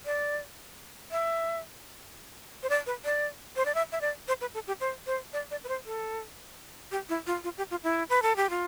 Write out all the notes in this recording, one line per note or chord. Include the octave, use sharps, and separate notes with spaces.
D5
E5
C5
D5
B4
D5
C5
D5
E5
E5
D5
C5
B4
A4
G4
C5
C5
D5
D5
B4
C5
A4
G4
E4
F4
F4
G4
F4
E4
B4
A4
G4
F4